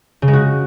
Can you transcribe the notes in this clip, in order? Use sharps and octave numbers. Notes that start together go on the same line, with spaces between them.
C#3
G#3
F#4